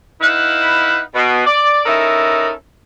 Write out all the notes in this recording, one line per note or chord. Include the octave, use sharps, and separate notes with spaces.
D#4 E4 B4 F5 F#5
B2
D5
C#4 D#4 E4 A4 A#4